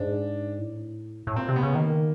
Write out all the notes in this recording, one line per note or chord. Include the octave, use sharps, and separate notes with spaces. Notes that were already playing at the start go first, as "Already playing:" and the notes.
Already playing: G#2 D4
A2
A2
A#2 C4
C3
B3
C#3
D#3 A#3